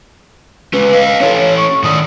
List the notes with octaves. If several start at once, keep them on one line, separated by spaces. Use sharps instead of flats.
G#3 C#4 B4
D#5 F5
C#4 E4 A4 C#5
C#6
A2 D#3 D5 D#6